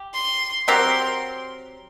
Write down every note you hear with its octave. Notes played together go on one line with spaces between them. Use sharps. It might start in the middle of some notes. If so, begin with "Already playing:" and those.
Already playing: G4
C6
F#3 C4 G4 A#4 C6